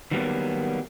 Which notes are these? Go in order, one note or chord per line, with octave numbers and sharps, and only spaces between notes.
D#3 F#3 G3 A#3 B3